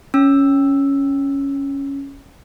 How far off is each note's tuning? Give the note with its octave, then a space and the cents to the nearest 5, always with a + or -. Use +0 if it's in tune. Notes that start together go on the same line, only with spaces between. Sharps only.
C#4 +0 E6 +0